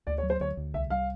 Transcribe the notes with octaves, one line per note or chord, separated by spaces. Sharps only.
D2 D5
C#5
F#3
C5
D2 C#5
D2
C2 E5
G3 F5